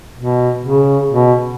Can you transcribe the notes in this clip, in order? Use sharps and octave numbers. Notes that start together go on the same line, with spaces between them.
B2
C#3
B2